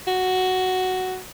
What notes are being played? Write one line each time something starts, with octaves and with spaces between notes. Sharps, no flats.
F#4